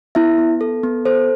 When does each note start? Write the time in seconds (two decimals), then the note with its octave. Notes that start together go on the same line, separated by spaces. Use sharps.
0.15 B3 E4 E5
0.38 B3
0.61 A4
0.83 B3
1.06 A4 C5